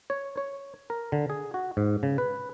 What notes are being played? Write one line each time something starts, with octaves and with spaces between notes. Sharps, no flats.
C#5
C#5
A#4
D3
G#4
F#4
G#2
C#3
B4